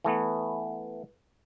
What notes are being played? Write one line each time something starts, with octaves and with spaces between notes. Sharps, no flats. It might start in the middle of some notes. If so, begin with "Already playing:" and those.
E3 A3 B3